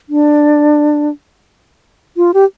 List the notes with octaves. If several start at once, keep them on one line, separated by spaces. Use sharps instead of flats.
D4
F4
G4